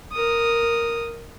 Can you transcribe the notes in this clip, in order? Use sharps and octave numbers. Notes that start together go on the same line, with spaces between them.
A#4 D#6